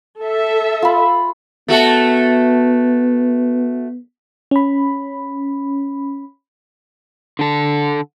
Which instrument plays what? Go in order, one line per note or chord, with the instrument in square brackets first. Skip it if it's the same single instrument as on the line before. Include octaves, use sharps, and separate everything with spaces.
[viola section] A4 E5
[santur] F4 B5
[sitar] A3 F#4 A4 [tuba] B3
[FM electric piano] C#4 B5
[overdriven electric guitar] D3 A4